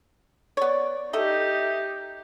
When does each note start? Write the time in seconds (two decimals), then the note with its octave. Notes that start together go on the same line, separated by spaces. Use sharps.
0.57 B3 C#5 D5
1.13 D#4 G4 A4 D#5 E5